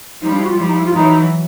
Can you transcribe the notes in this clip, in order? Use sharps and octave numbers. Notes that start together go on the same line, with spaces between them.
F3 G3 D#4
D4
E4
F#4
F4
F3 G3 E4
D#4
E4
F4
E3 F#3 D#4